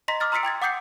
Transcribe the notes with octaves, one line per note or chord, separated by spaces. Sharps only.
D#5 A#5 C6 A#6 B6
D6 D#6 F6 A6
A#5 C6 E6 B6 C#7 D7
G5 C6 G#6 A6
F#5 D6 D#6 G6 C7 C#7